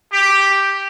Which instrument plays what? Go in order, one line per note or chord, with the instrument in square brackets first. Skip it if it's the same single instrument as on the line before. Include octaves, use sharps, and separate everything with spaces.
[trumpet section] G4